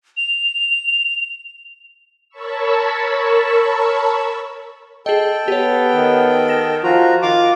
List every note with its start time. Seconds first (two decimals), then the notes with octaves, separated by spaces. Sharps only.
0.17 F7
2.29 A#4 C#5 A5 B5 C#6 E6
5.06 G#4 A4 D#5 G5
5.48 B3 G4 C#5
5.94 D#3
6.48 F6 A#6 E7
6.83 F3 F4 F#4 A#5
7.22 D#3 F4 D6